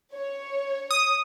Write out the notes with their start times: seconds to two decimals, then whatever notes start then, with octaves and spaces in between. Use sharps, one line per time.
0.13 C#5
0.91 D#6